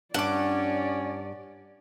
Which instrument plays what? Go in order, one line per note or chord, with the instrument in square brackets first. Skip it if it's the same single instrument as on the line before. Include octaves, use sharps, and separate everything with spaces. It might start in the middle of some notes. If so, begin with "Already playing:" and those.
[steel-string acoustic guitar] G2 [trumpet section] C#4 [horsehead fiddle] D5 [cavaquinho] F#5 D6